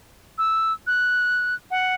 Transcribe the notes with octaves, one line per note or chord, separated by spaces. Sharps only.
E6
F#6
F#5